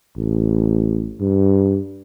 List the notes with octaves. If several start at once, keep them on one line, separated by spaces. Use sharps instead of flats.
A1
G2